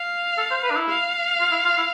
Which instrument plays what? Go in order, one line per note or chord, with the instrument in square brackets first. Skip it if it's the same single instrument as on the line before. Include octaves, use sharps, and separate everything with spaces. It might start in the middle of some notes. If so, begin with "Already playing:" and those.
Already playing: [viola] F5
[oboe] A4
C5
B4
D4
E4
[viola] F5
[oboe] F4
E4
F4
E4